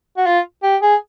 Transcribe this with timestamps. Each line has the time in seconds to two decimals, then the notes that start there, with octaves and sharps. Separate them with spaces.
0.17 F#4
0.26 F4
0.63 G4
0.82 G#4